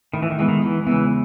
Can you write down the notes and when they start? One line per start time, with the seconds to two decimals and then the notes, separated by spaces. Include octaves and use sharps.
0.13 A2 D#3
0.23 E3
0.31 D#3
0.38 E3 G#3 B3
0.48 D#3
0.62 E2 E3
0.86 C#3 E3 G#3 B3